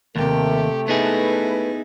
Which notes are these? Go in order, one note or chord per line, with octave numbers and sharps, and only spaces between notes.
D#2 C3 A3 G4 A#4
B3 D#4 E4 G#4 B4 B5